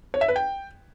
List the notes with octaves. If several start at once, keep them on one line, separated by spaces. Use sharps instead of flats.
C#5
E5
B4
G5